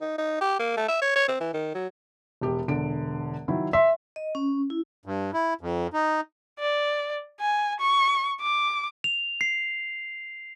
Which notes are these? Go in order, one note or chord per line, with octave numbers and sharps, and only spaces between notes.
D#4
D#4
G4
A#3
A3
E5
C#5
C#5
C4
E3
D#3
F#3
E1 G4
E1 D3 D7
D#3 F#3 E4
E5 C6
D#5
C#4
E4
G2
E4
F2
D#4
D5
G#5
C#6
D6
F7
C7